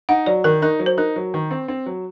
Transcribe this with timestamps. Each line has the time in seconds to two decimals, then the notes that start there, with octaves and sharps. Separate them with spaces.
0.09 D#4 F#5
0.26 F#3 D5
0.44 D#3 A#4
0.62 D#4 A#4
0.79 F#3
0.86 C5
0.98 D#4 A#4
1.16 F#3
1.34 D#3
1.51 C4
1.68 C4
1.86 F#3